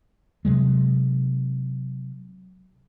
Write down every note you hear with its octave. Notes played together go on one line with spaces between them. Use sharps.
C3 F#3 G#3